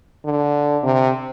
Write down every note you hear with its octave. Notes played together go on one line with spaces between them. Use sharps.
D3
C3